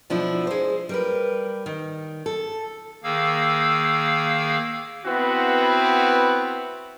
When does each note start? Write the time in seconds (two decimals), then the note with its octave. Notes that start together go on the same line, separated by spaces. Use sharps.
0.10 B2 F3 D4 E4
0.47 G#3 C5
0.89 G3 A#4 B4
1.66 D#3
2.26 A4
3.03 D#3 A#3 G#4 F5 E6
5.06 B3 C4 E4 F#4 B4